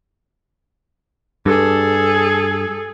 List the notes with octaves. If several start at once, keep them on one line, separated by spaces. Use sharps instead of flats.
G2 G#4 A4